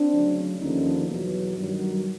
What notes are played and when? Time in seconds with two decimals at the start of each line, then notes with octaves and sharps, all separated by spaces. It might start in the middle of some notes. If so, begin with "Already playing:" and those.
Already playing: C4 D4
0.11 D2 C#3 F#3
0.59 D#2 D3 F3 C#4 D#4
1.08 E2 B2 F#3
1.57 G2 D#3 F#3